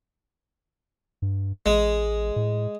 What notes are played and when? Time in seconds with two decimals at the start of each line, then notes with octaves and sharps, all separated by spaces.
1.22 G2
1.66 A1 G#3
2.36 A2